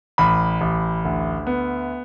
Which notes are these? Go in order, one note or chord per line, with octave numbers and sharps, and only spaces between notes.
A1 B5
A1
D2
B3